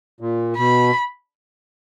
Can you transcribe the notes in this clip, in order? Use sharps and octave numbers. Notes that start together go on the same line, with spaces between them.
A#2
B2 B5